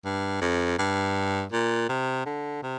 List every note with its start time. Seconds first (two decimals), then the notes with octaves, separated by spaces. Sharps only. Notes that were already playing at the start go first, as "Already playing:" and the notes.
0.05 G2
0.42 F2
0.79 G2
1.52 A#2
1.89 C3
2.26 D3
2.63 C3